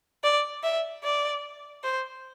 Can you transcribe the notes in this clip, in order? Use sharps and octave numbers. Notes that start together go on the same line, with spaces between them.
D5
E5
D5
C5